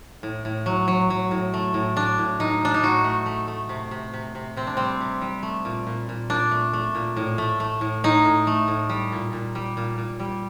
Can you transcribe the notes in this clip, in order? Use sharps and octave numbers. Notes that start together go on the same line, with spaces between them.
A2
A2
F#3
F#3
F#3
A2
A3
A2
A2 D4
A2
A2 D#4
A2 D4
D#4
A2 F#4
A3
A3
A3
C3
C3
C3
C3
C3 C4
D4
G3 C4
C3
G3
A3
A#2
A#2
A#2
A#2 D4
A3
A3
A#2
A2
A3
A3
A2
A2 D#4
A2
A3
A2
G3
A#2
A#2
G3
A#2
A#2
G3